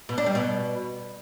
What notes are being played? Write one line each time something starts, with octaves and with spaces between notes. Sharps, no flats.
B2
D4
G3
B2